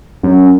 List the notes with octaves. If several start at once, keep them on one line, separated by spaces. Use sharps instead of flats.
F#2